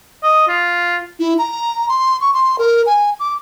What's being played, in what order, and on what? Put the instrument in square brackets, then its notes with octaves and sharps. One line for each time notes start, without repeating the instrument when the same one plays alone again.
[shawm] D#5
F4
[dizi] E4
A#5
C6
C#6
C6
A#4
G#5
D6